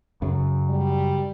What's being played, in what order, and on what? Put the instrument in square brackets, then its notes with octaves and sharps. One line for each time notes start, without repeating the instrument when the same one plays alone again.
[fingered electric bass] F#2 [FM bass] C#3
[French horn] G3